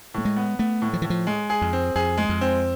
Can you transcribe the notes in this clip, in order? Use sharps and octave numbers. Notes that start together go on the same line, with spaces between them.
A2 A3
G#3
B3
A3 B3
A2
F3
A2 E3
F3
G#3
G#4
F2
C4
F2 G#4
G#3
F2
C4